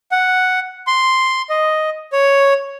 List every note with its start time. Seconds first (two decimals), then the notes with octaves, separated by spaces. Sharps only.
0.11 F#5
0.87 C6
1.49 D#5
2.12 C#5